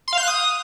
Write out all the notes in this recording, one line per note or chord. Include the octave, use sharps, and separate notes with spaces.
C6
F5
G6
F#6
D#6